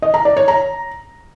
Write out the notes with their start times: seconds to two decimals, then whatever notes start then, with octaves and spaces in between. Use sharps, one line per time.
0.02 D#5
0.14 A#5
0.25 D5
0.37 C#5
0.48 A#5